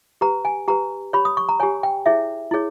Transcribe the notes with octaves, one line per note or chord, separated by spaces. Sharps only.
G4 B4 A#5
G#5
G4 B4 A#5
G4 C#5 B5
D#6
C#6
A#5
G4 C#5 G#5
G5
E4 G#4 C#5 E5
E4 G#4 C#5